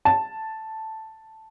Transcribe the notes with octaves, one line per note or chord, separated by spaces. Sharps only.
A5